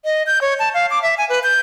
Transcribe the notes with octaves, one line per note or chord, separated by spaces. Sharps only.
D#5
G6
C#5
A5
F5
D6
E5
G#5
B4
G6